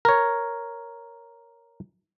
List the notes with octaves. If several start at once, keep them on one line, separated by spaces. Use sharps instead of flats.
A#4 C#5